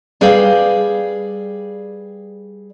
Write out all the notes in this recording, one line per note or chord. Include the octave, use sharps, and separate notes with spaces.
G3 G#4 B4 D5 F5 G5